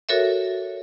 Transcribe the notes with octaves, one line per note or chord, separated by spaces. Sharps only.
F#4 A4 A#4 C#5 E5